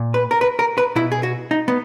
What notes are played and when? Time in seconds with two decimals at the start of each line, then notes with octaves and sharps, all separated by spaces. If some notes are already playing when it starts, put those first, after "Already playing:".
Already playing: A#2
0.14 B4
0.31 A#4
0.41 B4
0.59 A#4
0.78 B4
0.96 B2 E4
1.12 G#4
1.23 F#4
1.51 D#4
1.68 B3